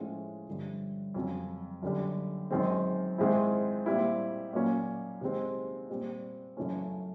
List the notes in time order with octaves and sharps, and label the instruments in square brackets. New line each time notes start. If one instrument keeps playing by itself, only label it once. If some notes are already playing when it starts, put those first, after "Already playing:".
Already playing: [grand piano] A2 F3 G#3 C#4 E4
G2 D3 F3
F2 C#3 F#3
F#2 D3 G3
F#2 D#3 G#3 C4
G#2 D#3 G#3 C4 E4
A#2 G3 C4 E4
A#2 F#3 A#3 C#4
C3 D#3 G#3 C4
A#2 G3 C4
F#2 C#3 E3 A3 C#4